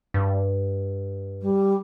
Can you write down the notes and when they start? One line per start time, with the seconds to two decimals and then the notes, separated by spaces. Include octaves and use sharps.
0.14 G2
1.41 G3